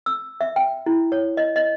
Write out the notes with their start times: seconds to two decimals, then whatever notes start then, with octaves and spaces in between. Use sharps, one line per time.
0.06 E6
0.41 E5
0.56 G5
0.86 E4
1.12 C#5
1.37 D#5
1.56 D#5